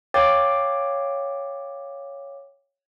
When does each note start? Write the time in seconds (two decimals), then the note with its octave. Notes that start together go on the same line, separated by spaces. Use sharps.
0.14 C#5 F5 G5 D6 A6